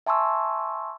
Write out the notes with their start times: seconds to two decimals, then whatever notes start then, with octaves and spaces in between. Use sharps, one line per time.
0.07 E5 G#5 A5 C6 C#6 E6